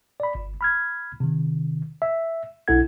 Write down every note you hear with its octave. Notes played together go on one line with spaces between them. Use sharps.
D5 B5
G1
B5 F6 G#6
C3 D#3
E5
B1 D4 E4 A4 F#5 G#6